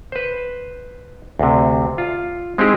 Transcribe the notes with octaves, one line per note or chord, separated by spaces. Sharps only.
B4 C5
D2 C3
F4
G#3 C4 D#4 E4 G4 G#4